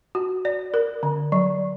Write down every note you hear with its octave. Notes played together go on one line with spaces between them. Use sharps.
F#4
D5
A#4
D3
F#3